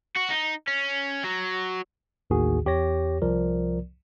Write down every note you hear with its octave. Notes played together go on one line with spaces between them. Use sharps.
F#4
D#4
C#4
F#3
A1 D#2 A2 D#3 F#4 G#4
E2 G4 C#5 A#6
C2 F3 A#4 D5